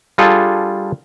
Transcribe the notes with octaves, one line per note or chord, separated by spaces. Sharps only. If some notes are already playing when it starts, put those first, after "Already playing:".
G3 D4 F4 G#4 A4